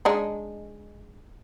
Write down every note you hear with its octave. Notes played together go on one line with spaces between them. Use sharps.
G#3 D4 D#4